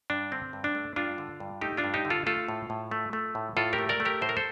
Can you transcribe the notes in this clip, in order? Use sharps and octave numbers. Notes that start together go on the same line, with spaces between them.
G2 D4
D3 C4
G2
D4
A3
G2 D4 F4
D3
G2
A3 D#4 G4
D4 F4
G2
D#4 G4
D3
F4 A4
A3 F4 A4
A2
A2
A3
A3
A2
A2 F4 A4
G4 A#4
A3
A#4 D5
A3
G4 A#4
A2 C5
A#4
A4 C5